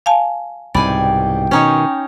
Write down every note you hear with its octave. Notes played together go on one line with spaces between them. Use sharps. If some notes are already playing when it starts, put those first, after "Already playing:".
F5 G#5 A5
C2 G#2 B2 D5 G5 G#5 B5
B2 D#3 C#4 D#4 C#5